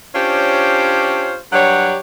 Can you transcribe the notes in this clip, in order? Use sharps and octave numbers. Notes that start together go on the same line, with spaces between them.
C#4 D4 F4 G4 C5 C#5
G2 F#3 D4 G4 C#5 F#5